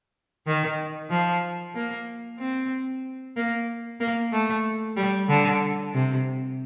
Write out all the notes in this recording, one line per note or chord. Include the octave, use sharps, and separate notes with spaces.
D#3
F3
A#3
C4
A#3
A#3
A3
G3
D3
C3